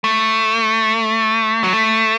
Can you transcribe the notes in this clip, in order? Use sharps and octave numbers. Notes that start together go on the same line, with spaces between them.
A3
F#3
A3